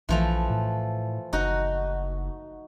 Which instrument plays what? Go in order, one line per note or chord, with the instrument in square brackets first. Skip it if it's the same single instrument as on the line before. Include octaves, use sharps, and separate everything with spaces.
[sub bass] A#1 [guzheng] E3 F3 A3
[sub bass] A2
[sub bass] F#1 [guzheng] D#4 F#4